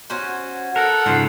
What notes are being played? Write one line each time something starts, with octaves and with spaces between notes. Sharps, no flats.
C#4 F#4 C5
A4 A#4 F#5
G#2 C#3 F3